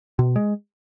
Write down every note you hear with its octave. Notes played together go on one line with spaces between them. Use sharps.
B2
G#3